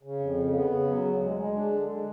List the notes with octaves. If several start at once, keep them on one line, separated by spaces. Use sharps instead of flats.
C#3
F2
C#3
B3
C#3
F#3
D2
G#3
G#3
D4
D3
G#3